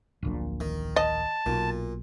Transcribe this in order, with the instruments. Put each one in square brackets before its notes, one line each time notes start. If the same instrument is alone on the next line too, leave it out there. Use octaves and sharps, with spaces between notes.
[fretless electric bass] D1 A#1 A#2
[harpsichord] D#3
[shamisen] D#5 [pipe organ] A5
[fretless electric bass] B1 [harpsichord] A#2